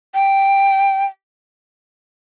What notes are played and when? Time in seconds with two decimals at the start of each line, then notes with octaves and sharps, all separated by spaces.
0.14 G5